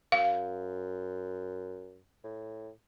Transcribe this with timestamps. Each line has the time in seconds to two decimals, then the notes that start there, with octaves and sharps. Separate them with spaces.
0.12 F#2 F5
2.24 A2